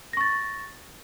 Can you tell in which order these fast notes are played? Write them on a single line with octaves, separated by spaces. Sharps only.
A#6 C#6 A6